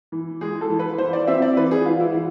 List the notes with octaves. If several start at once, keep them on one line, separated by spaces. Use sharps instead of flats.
E3
G#3 G#4
A4
E3
B4
E3 C5
D5
C4 E5
D5
E3 B4
G#4
E3 F4
E4
E3 F4